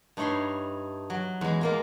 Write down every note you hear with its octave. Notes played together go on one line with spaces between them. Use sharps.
G2 D#4 E4 C#5 B5 C6
F#3
E2 G#3
G#3 A#3 F4